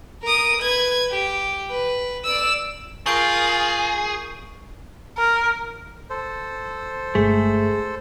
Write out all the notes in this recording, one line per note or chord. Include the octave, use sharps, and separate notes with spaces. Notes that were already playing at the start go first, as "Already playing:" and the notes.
A#4 D#6
B4 G#6
G4
B4
D5 E6
F4 G#4 A#4 C#6 G6 D7
A#4
A4 C5
G1 G#3 A3 G#4